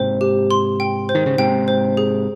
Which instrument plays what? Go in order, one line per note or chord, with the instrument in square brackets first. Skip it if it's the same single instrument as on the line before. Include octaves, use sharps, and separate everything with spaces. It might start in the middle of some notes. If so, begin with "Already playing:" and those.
Already playing: [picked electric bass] G#2 C3 [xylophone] C5 G5
[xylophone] G4
C6
G5
C5
[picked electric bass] D#3
C#3
[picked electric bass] G#2 C3 [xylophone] G5
[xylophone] C5
G#4